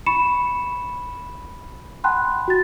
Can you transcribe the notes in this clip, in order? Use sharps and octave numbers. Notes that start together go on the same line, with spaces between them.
B5 C#6 C#7 E7
F#5 G5 A5 B5 C6 F#6
F#4 A6